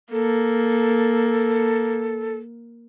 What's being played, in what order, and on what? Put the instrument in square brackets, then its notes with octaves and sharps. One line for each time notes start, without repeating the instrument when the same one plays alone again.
[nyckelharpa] A#3 [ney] A4